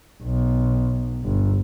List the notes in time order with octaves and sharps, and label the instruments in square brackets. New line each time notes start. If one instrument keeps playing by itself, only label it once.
[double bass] B1
G1